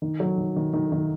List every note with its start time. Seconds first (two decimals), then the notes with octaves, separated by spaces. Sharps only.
0.02 D#3
0.20 F#3
0.38 D#3
0.56 D#3
0.73 D#3
0.92 D#3